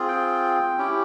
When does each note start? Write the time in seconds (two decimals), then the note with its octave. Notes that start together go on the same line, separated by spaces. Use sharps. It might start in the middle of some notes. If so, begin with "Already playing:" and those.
Already playing: C4 F4 G#4
0.08 G5
0.78 C#4 E4 G4